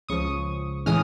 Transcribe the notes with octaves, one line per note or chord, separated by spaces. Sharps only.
C#2 C#3 F3 C#6 D#6
A2 E3 G#3 C#4 D#6 F6